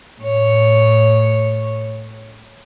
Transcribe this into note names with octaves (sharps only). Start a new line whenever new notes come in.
A2 C#5